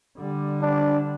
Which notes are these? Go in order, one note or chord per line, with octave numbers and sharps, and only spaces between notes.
D3 G3
D4